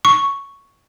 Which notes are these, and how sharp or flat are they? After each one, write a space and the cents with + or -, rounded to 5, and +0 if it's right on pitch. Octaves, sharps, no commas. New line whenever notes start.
C#6 +0